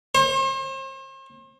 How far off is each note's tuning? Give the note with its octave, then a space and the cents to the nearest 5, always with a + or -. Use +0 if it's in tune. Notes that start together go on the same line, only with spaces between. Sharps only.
C5 +40